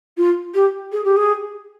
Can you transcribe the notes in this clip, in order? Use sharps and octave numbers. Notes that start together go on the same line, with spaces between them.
F4
G4
G#4
G4
G#4